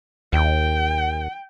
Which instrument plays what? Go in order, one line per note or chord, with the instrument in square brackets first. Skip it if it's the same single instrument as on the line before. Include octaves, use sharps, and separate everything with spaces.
[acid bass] D#2 [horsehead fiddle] G5